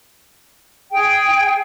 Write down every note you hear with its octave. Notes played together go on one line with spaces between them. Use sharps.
G#4 G5